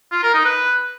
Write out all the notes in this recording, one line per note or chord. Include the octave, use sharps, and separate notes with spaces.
F4
A#4
D#4
B4